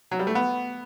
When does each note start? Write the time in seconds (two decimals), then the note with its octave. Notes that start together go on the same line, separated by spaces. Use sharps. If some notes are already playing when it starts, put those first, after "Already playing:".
0.12 F#3
0.19 G3
0.27 A3
0.35 B3